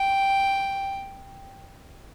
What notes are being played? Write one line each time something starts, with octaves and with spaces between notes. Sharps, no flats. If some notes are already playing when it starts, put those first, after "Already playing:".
Already playing: G5